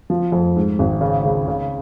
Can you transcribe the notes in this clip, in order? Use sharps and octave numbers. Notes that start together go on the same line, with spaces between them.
F3
F2
G#2
G#1
C#3
C#2
C#3